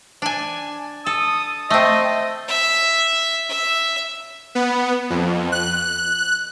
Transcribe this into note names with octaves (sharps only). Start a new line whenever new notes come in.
D4 G#5
A4 D#6
A3 C4 D#5
E5
E5
B3
F2
F#6